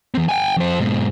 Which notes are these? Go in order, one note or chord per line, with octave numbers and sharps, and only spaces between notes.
E2 C4
G5 G#5
F2 C5
G#2 B2